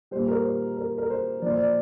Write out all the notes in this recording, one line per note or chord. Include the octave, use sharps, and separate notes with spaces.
A#2 G3 C5
A#4
C5
A#4
A#4
C5
A#2 F3 D5
C5
D5